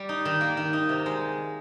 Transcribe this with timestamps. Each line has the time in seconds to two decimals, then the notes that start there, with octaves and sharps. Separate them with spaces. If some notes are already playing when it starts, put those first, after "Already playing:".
Already playing: G3
0.09 D#4
0.25 D#3
0.41 A#3
0.57 D#3
0.73 D#4
0.89 C3
1.06 G#3